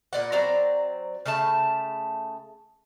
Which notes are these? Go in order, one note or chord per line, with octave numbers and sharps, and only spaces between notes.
A#2 D5 F#5
F#3 C4 D5 A#5
C#3 A3 E5 A5